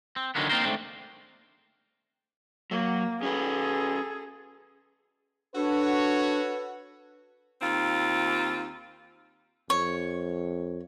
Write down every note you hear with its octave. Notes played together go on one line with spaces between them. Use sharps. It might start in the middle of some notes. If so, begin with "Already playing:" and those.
C4
D3 D#3 F#3 G#3 A#3 B3
A#3 C4 D#4 F4 A#4 C5
G#2 E3 A3 C4 D4
F#3 A#3
C#4 F#4 G#4 A4 B4
D4 F#4 A4 B4 C#5
D#2 C4 F4
F2 C#5